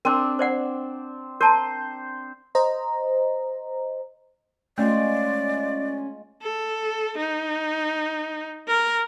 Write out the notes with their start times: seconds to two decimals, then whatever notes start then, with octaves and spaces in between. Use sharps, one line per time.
0.05 C4 D4 A#4
0.39 C5 D5 F#5
1.41 A#4 C5 A5 A#5
2.55 C5 D#5 A#5
4.78 G#3 A3 C#4 F4 D5 C#6
6.42 A4
7.17 D#4
8.68 A#4